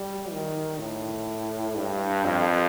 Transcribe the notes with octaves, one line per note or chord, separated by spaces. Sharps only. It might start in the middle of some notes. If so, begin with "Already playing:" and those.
Already playing: G3
D#3
A2
G2
F2